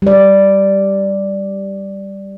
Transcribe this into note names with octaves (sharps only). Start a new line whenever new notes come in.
G3 D5